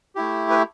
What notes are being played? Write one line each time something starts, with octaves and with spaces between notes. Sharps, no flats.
A3 E4 G4
B4